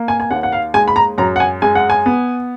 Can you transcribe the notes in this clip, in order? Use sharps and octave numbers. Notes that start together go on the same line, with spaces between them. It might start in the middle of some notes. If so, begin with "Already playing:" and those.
Already playing: A#3
G#5
G#5
D#2 F#5
F#5
F5
G#3 G#5
B5
A#5
F#2 A#5
F#5
G#5
G#3 G#5
F#5
G#5
B3